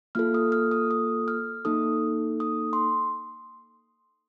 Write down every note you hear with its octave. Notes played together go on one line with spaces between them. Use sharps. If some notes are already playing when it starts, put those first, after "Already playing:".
A#3 F4 A4 F6
D#6
F6
D#6
D#6
F6
A#3 D#4 A4 D#6
D#6
C6